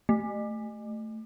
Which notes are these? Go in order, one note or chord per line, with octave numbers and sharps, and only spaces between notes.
A3